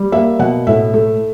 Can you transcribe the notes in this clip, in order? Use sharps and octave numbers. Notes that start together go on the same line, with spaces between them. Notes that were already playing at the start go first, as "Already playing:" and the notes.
Already playing: G3
A#3 E5
B2 F#5
A2 E5
A3